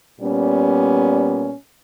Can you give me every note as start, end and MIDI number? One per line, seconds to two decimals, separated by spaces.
0.20 1.52 46
0.20 1.52 55
0.20 1.52 59
0.20 1.52 61